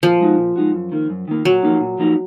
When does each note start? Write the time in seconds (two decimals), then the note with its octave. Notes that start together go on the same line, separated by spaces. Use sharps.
0.03 A#2 F3
0.20 G#3 D#4 F#4
0.38 A#2
0.56 G#3 D#4 F#4
0.74 F#2
0.92 D#3 A#3
1.10 F#2
1.28 D#3 A#3
1.45 A#2 F#3
1.63 F3 A#3 D#4
1.81 A#2
1.99 F3 A#3 D#4